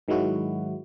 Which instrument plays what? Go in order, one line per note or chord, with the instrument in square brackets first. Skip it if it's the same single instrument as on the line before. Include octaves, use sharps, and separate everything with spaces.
[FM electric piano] G#2 D#3 F#3 G#3 E4 F#4